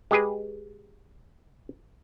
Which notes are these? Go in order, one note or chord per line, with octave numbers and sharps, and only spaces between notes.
G#3 G4 G#4 B4